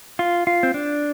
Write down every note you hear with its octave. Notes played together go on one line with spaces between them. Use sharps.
F4
F4
C4
D4